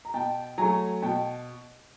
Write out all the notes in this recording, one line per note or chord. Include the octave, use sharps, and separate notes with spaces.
A#5
B2 G5 A5
F#3 A3 G#5 A#5
B2 G5 A5